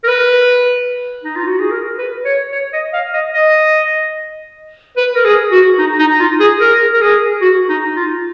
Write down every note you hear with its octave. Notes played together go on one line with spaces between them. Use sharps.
A#4
B4
D#4
F4
F#4
G#4
A#4
B4
C#5
C#5
D#5
F5
D#5
D#5
B4
A#4
G#4
F#4
D#4
D#4
F4
G#4
A#4
A#4
G#4
F#4
D#4
F4